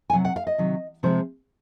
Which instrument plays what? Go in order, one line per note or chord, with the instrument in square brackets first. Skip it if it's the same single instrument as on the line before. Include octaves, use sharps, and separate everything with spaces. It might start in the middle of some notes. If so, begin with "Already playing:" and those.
[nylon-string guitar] G#5
C3 F#3 F#5
F#5
F5
D#5
C3 D#3 F#3
C3 F3 G#3 C5